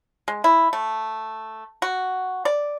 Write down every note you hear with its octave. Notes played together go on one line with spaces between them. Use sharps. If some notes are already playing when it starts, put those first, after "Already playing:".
G#3
E4
A3
F#4
D5